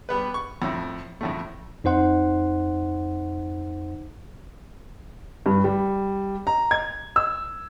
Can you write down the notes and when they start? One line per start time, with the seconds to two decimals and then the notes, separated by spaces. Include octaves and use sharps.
0.09 G3 B3 B4
0.34 C#6
0.62 F2 A2
1.21 F2 A2 A3
1.84 F2 D#4 C5 F#5 C6
5.46 G2
5.64 G3
6.47 A#5
6.71 G#6
7.16 E6